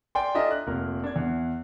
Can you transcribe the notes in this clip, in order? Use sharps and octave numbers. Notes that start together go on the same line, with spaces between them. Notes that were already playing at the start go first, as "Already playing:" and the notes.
D5 G5 G#5 C6
D4 F4 A4 D#5 E5 A#5
F#6
F1 A#2 A#4
D4 G#6
E2